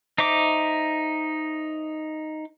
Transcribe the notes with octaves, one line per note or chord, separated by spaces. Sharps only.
D#4 C5 E5 D6